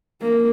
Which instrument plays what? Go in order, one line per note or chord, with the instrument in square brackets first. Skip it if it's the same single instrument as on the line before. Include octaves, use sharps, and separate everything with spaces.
[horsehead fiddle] A#3